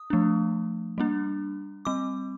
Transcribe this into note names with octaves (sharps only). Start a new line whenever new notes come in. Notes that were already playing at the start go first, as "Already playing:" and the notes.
Already playing: D#6
F3 A3 D4
G3 A#3 D4
G3 C4 D6